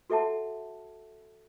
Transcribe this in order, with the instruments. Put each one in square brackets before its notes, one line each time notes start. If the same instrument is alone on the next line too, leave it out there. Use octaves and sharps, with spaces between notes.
[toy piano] F#4 A4 E5 F#5 A5